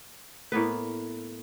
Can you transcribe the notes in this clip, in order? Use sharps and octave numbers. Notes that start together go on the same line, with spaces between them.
A2 A#3 B3 B4